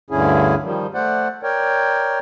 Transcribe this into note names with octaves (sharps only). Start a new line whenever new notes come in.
D2 G2 D3 C#4 E4 G#4
D#3 F3 G3
A3 C5 D5 F#5
A#4 C#5 D5 G5